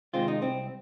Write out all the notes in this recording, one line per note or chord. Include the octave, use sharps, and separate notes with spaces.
C3 D#3 G#3 C4 F4
D#4
C2 C4